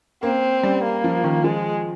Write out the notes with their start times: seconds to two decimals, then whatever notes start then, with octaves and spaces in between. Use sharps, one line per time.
0.23 A#3 C4
0.63 G3
0.83 A#3
1.04 F3
1.24 D#3
1.44 F3 G#3